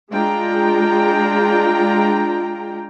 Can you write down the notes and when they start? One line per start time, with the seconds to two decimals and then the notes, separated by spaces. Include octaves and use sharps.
0.10 G#3 D4 F4 G5 A#5